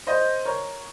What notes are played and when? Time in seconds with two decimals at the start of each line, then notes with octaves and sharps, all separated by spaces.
0.07 C5 D#5
0.45 A#4 C#5